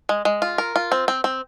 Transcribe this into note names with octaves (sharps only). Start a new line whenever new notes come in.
G#3
G#3
F4
A#4
F4
C4
C4
C4